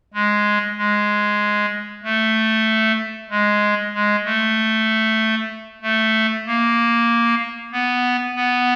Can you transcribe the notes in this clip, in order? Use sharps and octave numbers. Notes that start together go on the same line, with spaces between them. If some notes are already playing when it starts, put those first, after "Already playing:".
G#3
G#3
A3
G#3
G#3
A3
A3
A#3
B3
B3